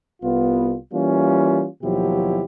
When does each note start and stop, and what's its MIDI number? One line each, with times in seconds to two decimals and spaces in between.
0.23 0.75 36
0.23 0.75 59
0.23 0.75 65
0.93 1.65 52
0.93 1.65 55
0.93 1.65 58
0.93 1.65 61
0.93 1.65 65
1.83 2.44 39
1.83 2.44 47
1.83 2.44 53
1.83 2.44 54
1.83 2.44 64
1.83 2.44 67